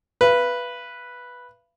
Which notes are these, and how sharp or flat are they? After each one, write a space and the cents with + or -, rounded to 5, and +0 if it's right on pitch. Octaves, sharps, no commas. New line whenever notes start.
B4 -5 F5 -40